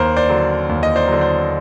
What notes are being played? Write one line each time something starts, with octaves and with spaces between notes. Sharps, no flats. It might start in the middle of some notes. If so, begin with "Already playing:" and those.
Already playing: D#2 A#4 C5
C5 D5
D3 F#3
D#2
D#5
C5 D5
D3 F#3
C5 D5